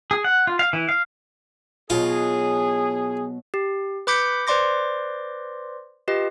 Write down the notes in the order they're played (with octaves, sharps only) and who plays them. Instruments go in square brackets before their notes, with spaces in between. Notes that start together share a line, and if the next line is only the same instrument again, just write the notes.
[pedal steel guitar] G#4
F#5
F4
F5
E3
F5
[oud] B2 F#3 D#4 [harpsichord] F4 [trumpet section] G#4
[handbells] G4
B4 B5 D6 G6 B6 C#7
B4 C5 D5 C6 D6 A#6
F4 G4 B4 D#5